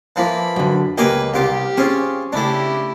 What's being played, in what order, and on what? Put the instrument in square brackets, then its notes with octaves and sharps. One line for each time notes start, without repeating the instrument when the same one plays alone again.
[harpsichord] E3 F3 A#3 [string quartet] B5
[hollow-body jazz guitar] F#2 D3
[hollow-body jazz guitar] C#2 A#3 D#5 [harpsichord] G4 G#5 D6 [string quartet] B4
[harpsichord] C2 F4 D6 [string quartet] G4
[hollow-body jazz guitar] C4 C#4 [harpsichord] F4 G#4
[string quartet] C#3 E4 G4 [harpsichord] A3 D4